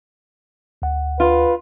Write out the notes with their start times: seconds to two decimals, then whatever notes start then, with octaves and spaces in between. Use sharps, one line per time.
0.82 D2 F#5
1.20 F4 B4